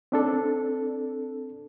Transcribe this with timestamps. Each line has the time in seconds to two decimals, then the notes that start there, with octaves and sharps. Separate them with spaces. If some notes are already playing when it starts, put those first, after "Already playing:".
0.12 C4 D4 A4